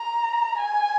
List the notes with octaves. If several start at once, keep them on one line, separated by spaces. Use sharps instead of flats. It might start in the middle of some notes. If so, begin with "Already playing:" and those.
Already playing: A#5
G#5